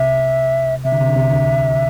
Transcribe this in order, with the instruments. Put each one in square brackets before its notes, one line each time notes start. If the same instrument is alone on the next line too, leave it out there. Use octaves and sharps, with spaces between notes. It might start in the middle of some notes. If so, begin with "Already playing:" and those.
Already playing: [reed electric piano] C2 C3 [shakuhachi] E5
[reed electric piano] C3 [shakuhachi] E5
[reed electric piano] D3
C3
D3
C2 C3
D2 D3